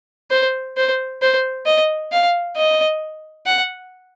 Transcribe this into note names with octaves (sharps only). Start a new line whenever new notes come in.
C5
C5
C5
D#5
F5
D#5
F#5